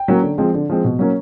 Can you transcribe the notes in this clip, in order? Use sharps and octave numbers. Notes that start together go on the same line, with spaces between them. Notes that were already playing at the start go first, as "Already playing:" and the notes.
Already playing: G5
F#3 A#3 C#4
D3
F3 G#3 C4
D3
F3 G#3 C4
B2
F#3 A#3 C#4